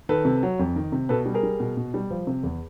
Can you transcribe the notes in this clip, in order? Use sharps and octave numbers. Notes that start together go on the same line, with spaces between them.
D#3 A4 B4
C3
F#3
F2
D#3
C3
B2 A4 B4
G3
G#4 A#4
G3
B2
B2
G3
F3
C3
E2